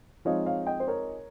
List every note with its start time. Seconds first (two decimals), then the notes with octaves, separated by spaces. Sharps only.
0.25 F3 G#3 C4 D#4 C#5 F5
0.46 C#5 F5
0.67 D#5 G5
0.80 C5
0.88 A#4 C#5